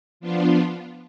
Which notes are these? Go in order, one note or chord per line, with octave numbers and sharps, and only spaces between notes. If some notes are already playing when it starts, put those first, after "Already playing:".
F3 B3 D4 F4